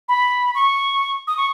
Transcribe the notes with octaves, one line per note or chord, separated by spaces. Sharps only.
B5
C#6
D#6
C#6